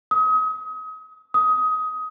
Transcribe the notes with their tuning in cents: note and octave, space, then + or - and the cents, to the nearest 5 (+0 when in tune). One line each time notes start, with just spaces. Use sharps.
D#6 +35
D#6 +20